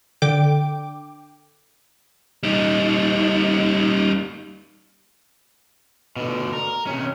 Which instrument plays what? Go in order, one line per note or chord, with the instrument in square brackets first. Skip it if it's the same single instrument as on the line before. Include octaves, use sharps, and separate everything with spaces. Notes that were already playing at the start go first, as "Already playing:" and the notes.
[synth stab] D3 G5 D6
[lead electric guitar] G3 D#4
[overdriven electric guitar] B2 D3
A#4
C3 C#4